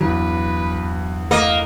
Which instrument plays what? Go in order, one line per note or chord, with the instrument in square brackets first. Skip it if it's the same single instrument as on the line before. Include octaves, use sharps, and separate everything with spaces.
[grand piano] E2 G2 [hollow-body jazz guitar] F#3 [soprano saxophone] B4
[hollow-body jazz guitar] A3 [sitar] A#3 [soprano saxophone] D#5